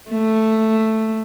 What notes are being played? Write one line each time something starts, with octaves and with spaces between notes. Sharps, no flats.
A3